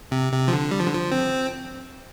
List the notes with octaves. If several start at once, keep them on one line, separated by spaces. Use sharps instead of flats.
C3
C3
F3
D3
G3
F3
D3
F3
C4